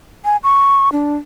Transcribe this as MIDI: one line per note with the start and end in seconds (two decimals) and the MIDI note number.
0.25 0.37 80
0.44 0.92 85
0.92 1.15 62